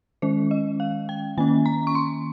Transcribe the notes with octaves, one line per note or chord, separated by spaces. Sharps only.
D#3 G#3 C#4 C5
D#5
F5
G5
D#3 A#3 C#4 G#5
A#5
C#6
C6